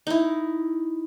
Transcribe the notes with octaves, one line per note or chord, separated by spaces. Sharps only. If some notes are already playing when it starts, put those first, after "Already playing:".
D#4 E4